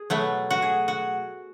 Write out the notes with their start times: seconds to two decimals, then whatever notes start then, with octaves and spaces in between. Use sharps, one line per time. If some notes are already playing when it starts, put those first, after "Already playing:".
Already playing: G#4
0.10 B2 F#3 A3
0.50 F#4
0.62 G#4
0.88 F#4